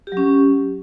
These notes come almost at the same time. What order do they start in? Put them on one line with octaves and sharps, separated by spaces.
G4 F#3 C#4